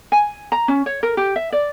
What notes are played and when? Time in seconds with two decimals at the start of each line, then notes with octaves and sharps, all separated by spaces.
0.12 G#5
0.52 A#5
0.68 C#4
0.86 C#5
1.03 A#4
1.17 G4
1.36 E5
1.52 D5